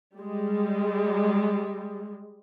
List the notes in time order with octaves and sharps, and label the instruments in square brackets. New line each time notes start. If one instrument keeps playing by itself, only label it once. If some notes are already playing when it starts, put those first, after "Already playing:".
[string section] G3 G#3